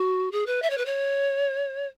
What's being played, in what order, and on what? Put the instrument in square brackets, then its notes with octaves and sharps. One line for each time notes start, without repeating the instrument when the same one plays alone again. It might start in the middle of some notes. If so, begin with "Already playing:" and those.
Already playing: [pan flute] F#4
G#4
B4
E5
C#5
B4
C#5